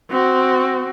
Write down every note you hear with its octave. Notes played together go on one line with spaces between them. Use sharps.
C4 F#4